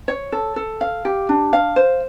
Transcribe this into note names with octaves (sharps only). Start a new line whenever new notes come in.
C#5
A4
A4
F5
G4
D4
F5
C5